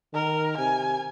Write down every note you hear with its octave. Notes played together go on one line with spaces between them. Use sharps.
D#3 A#4
C3 G#5